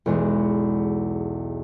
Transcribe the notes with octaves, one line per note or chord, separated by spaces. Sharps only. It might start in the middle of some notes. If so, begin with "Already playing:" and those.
B1 E2 G#3